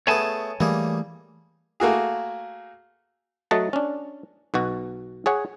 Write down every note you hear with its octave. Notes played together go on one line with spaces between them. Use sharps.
A3 B3 G#4 C#5 G#5 A5
E3 G3 A3 A#3 G#4
A3 A#3 F#4 G#4
F#3 A3 D#5 F#5 A5
C#4 D4
B1 B2 F#4
G#4 C#5 F#5